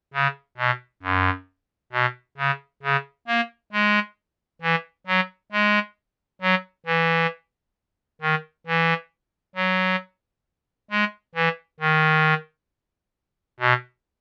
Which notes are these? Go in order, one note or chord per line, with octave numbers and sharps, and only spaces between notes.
C#3
B2
F#2
B2
C#3
C#3
A#3
G#3
E3
F#3
G#3
F#3
E3
D#3
E3
F#3
G#3
E3
D#3
B2